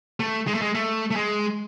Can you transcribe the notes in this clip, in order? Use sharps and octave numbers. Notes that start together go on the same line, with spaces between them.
A3
G#3
A3
G#3
A3
A3
G#3